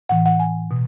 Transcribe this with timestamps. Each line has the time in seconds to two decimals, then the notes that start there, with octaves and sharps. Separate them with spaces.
0.09 A2 E3 F#5
0.26 F#5
0.40 G#5
0.71 B2